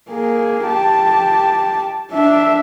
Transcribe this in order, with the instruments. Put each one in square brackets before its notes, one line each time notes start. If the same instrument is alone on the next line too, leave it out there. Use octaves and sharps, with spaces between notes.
[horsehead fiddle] A#3 G#4
G4 A5
D4 E5